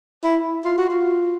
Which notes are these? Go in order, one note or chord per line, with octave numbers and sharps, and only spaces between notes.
E4
F4
F#4
F4